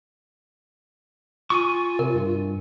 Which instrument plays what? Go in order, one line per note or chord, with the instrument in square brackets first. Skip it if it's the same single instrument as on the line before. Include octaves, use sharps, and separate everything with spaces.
[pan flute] F4 [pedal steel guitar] G#5 C#6
[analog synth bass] C3 [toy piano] A#4
[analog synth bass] G2